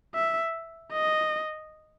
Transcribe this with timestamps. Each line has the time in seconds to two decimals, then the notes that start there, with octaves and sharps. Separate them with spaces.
0.15 E5
0.93 D#5